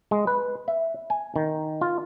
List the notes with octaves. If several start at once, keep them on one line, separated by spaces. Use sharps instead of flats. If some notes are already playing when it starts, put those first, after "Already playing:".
G#3
B4
E5
G#5
D#3
F4